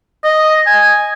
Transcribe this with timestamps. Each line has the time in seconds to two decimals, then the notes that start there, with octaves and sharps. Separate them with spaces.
0.24 D#5
0.67 G#5